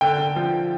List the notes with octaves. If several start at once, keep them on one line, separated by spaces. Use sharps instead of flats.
D3 G5
D3
F3